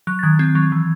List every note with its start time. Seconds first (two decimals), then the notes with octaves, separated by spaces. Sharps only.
0.07 F#3 F#6
0.19 A6
0.23 D#3 G#6
0.39 C4 G#6
0.55 F#3
0.72 E3